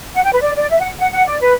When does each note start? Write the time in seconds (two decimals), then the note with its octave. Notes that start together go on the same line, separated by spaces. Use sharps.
0.14 F#5
0.23 G5
0.32 B4
0.42 D5
0.56 D5
0.70 E5
0.80 F#5
0.99 F#5
1.13 F#5
1.27 D5
1.41 B4